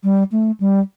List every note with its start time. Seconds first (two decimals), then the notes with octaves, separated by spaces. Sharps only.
0.04 G3
0.32 A3
0.60 G3